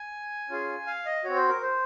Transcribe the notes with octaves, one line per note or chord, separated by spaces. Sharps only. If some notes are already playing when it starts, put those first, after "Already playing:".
Already playing: G#5
C#4 F4 G#4
F5
D#5
C4 F#4 C#5
C5
A#4
C5